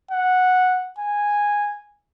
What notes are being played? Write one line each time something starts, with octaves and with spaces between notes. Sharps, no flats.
F#5
G#5